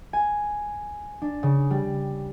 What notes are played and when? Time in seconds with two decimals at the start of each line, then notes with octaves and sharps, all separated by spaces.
0.13 G#5
1.22 D4
1.43 C#3
1.71 G3